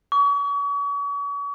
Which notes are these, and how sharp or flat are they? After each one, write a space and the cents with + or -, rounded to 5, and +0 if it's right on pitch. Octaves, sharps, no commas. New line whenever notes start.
C#6 +40